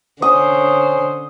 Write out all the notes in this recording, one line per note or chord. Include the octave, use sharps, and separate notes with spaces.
D3 C#4 C5 D#6